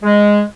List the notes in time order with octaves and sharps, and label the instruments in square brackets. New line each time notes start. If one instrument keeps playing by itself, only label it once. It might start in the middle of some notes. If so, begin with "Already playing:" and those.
[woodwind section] G#3